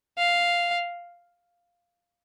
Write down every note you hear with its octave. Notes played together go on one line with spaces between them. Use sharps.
F5